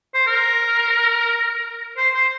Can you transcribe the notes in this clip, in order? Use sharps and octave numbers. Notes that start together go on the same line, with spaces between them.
C5
A#4
C5
C5